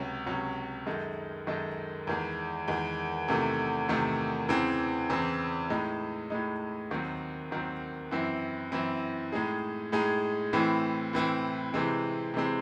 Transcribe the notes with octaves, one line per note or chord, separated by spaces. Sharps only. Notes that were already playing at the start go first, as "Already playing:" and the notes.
Already playing: C#2 C3 F#3 C#4
C#2 C3 F#3 C#4
F#2 D#3 G#3 D#4 A4
F#2 D#3 G#3 D#4 A4
E2 D#3 G#3
E2 D#3 G#3
E2 C3 D#3 A3
E2 C3 D#3 A3
E2 C#3 E3 C4
E2 C#3 E3 C4
A2 G#3 D#4
A2 G#3 D#4
D#2 D#3 F#3 C4
D#2 D#3 F#3 C4
F#2 E3 C4 E4
F#2 E3 C4 E4
A2 G#3 D#4 G#4
A2 G#3 D#4 G#4
A2 E3 C4 E4
A2 E3 C4 E4
C3 E3 G#3 C4
C3 E3 G#3 C4